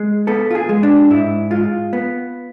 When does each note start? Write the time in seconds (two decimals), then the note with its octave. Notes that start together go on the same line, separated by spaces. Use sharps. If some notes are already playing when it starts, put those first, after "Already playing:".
Already playing: G#3
0.27 B3 A4
0.51 F4
0.55 G#4
0.69 G#3
0.83 D4
1.10 G#2 E4
1.51 G#3 F4
1.93 B3